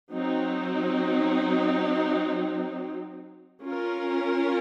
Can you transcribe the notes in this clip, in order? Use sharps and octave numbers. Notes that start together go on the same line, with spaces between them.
F#3 C4 D#4
C#4 F4 A#4